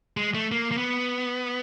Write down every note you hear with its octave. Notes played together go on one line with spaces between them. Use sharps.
G#3
A3
A#3
A#3
B3